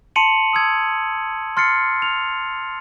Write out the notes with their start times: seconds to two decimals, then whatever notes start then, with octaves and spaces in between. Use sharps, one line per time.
0.16 A5 C6 C#7 D#7 F7 F#7
0.53 D#6 E6 G#6
1.57 C6 F6 A6 C7 C#7
2.02 F6 F7